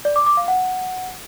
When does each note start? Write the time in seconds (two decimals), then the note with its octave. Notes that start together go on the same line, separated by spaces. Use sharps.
0.05 D5
0.16 D6
0.27 D6
0.37 F5
0.48 F#5